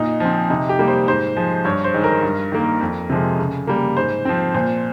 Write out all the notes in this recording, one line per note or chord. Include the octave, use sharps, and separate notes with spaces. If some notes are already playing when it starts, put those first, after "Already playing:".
Already playing: A#2 D#4
F3 C4
C3 D#4
G4
G3 A#3
C5
G#2 C5
F3 G#3
G2 C#5
C5
D#3 G#3
A#4
G2
D#3 A#3
F2
C3 F3 G#3
C#3
G3 A#3
G#2 C5
F3 C4
A#2 C5